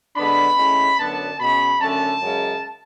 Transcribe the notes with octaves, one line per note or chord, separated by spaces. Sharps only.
D3 G#3 B3 D4 B5
A2 G#3 C#4
F#2 D3 F#3 B3 D4 A5
B2 G#3 C#4 B5
F#2 D3 A3 C#4 A5
F#2 C#3 G#3